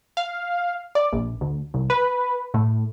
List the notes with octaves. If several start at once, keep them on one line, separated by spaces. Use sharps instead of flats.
F5
D5
A#1
D2
C2
B4
A2